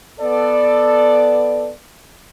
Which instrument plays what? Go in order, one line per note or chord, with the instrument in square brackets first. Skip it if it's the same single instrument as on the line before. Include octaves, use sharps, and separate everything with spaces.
[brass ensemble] B3 A4 D5